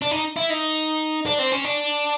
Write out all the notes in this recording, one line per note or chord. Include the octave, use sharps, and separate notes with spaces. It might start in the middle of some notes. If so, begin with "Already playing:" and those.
D4
D#4
E4
D#4
D4
C4
C#4
D4